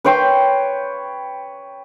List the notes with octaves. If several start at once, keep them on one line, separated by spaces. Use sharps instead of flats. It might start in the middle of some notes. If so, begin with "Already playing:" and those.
B4 C#5 G5 C6